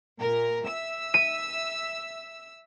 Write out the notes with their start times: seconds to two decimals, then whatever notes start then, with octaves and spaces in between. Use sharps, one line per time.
0.20 A#2 A#4
0.66 E5 E6
1.14 D#7